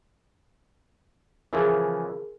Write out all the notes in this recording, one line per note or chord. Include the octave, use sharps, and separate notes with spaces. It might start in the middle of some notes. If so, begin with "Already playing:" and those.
C#3 E3 F3 G#4 A#4